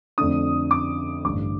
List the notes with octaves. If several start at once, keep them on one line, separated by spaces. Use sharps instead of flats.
F2 D3 A3 D4 D#6
D6
A1 G2 D3 D6